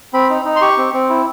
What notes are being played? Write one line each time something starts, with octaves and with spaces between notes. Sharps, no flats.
C4 B5
D#4
D#4
C6
G4 C#6
C4
C4
E4